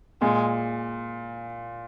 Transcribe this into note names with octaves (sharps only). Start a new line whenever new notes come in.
A#2 G#3